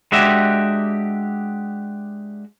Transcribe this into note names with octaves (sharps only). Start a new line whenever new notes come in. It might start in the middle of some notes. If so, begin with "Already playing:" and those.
G#3 D4 F#4 G4 E5